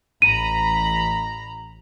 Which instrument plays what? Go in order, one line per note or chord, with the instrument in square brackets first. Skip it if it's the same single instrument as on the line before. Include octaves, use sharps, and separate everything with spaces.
[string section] A1 A#5 B5 [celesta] D#7